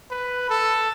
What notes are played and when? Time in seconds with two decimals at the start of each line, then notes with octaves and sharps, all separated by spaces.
0.11 B4
0.49 A4